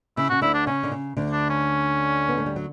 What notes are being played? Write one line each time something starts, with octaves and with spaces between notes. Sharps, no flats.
C#3 C#4 E4
C#3 F#4
D2 D3 E4
D4
C#3 C#4
D3
C#3
D2 D3
D4
C#4
B3
A3
G3
F#3